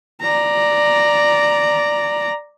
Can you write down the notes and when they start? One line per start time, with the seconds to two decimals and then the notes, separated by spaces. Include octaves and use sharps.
0.21 D5 A#5